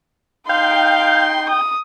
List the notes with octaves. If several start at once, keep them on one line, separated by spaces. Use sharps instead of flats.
D#4 F5 G5 C6
D#6